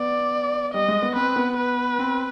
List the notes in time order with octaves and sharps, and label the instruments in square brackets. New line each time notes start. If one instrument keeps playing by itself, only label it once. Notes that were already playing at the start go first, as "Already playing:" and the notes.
Already playing: [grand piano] B3 [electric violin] D5
[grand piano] G3 [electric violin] D#5
[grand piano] G#3
B3
[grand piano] C4 [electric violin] B4
[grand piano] B3
[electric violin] B4
[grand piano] C4